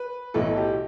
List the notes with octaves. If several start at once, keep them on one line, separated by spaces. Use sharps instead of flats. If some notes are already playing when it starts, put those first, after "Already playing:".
Already playing: B4
B1 A2 E3 A4
G4